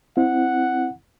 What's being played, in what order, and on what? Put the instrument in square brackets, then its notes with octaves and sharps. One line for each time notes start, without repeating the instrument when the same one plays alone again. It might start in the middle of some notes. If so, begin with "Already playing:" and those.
[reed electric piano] C4 E4 [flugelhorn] F#5